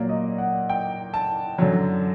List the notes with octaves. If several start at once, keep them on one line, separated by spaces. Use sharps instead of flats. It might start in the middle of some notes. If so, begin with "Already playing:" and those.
Already playing: A#2 F#3 A#3 D5
D#5
F#5
G5
A5
F#2 D3 F#3